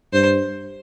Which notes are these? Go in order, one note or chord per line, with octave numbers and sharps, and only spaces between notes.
G2 C5